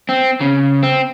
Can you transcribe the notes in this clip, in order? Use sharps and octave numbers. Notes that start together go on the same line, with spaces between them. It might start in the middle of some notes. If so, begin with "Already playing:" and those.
C4
C#3
C4